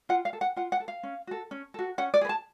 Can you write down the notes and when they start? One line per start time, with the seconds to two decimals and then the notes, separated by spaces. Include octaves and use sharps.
0.09 F4 F#5
0.25 F5
0.33 A4
0.41 F#5
0.56 F4 F#5
0.72 F#5
0.80 A4
0.88 F5
1.03 C#4
1.27 F#4 A4
1.51 C#4
1.74 F#4 A4
1.98 C#4 F#5
2.14 D5
2.21 G#4 B4
2.29 A5